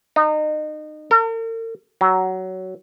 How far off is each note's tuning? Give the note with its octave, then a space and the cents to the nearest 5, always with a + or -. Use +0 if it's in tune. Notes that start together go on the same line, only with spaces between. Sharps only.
D#4 -30
A#4 -45
F#3 +15